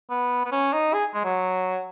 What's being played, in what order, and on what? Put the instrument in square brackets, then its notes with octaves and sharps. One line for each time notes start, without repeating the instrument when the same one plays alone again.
[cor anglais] B3
B3
C#4
D#4
G#4
G#3
F#3